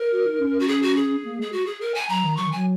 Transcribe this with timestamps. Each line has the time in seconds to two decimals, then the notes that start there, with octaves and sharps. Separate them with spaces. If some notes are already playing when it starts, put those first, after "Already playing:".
Already playing: A#4
0.12 F#4
0.26 D#4
0.40 C#4
0.60 F#4
0.68 G#4
0.83 F#4
0.96 G#4
1.25 A#3
1.39 G#3 G#4
1.52 F#4
1.66 G#4
1.81 A#4
1.94 G#5
2.09 F#3 A#5
2.24 D#3
2.37 F#3 C#6
2.46 D#3
2.52 F#3 G#5